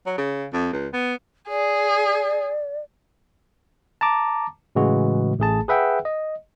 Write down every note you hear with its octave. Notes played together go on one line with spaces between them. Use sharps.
F#3
C#3
F2
C#2
B3
G#4 D5
A5 A#5 D6
A2 C#3 E3 G#3 F#4
A1 A3 G#4 A5
G#4 B4 E5 F#5 G5
D#5